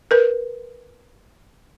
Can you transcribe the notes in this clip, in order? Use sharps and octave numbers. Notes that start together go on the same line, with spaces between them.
A#4 B4